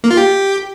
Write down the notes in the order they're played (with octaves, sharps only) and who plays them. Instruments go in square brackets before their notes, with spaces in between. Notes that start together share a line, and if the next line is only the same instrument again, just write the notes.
[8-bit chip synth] A#3
F4
G4